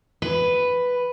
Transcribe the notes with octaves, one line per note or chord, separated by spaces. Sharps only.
B4